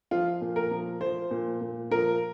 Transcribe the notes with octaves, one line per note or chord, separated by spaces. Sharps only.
F3 F4
A#2
A#4
F3
F3 C5
A#2
A#2
F3 A#4